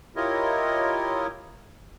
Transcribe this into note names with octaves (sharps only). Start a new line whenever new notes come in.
E4 F4 G4 A#4 C#5 D#5